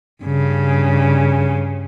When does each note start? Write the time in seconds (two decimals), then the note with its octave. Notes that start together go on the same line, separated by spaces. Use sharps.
0.23 G2 C#3